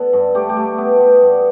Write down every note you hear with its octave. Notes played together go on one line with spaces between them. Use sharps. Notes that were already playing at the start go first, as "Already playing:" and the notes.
Already playing: D3 B3 A4 B4
G2
A3 G4
G4
A3
B3
B3
G2